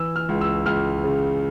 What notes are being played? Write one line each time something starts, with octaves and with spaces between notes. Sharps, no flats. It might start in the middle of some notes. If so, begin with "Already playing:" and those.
Already playing: E3 E6
F6
C#2
E6
C#2 F6
C#3